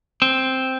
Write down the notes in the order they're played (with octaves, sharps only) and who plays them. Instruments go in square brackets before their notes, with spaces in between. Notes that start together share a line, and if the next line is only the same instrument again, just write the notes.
[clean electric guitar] C4